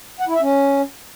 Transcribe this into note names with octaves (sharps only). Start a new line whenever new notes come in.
F#5
E4
E5
C#4